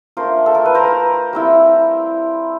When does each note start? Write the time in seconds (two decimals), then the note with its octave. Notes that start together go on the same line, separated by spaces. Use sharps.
0.17 A3 D4 F4 A#4 C5
0.46 A4
0.55 A#4
0.65 B4
0.74 A#4 C5
1.33 G3 C4 E4